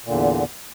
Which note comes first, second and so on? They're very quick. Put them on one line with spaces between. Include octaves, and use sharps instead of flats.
A#2 D3 E2